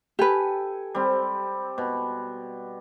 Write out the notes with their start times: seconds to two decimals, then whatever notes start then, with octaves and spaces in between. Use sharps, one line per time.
0.19 G4 A4 B4 G5 G#5
0.95 G3 C4
1.78 B2